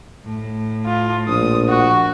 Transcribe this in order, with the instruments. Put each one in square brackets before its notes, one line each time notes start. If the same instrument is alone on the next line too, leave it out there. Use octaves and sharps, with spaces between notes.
[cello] A2
[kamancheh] F4
[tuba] A#1 [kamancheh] D#6
[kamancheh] F#4